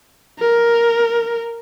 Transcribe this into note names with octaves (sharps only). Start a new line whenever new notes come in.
A#4